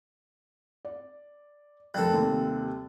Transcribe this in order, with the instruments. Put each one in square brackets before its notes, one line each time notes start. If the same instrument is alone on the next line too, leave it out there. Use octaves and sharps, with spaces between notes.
[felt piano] D5
[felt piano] F1 A#4 F#6 [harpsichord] G3 C4 A4
[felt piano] D#2 C3